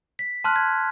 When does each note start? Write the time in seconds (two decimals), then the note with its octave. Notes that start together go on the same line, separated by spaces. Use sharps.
0.19 B6
0.44 A5 C6 F6 F#6
0.56 G#6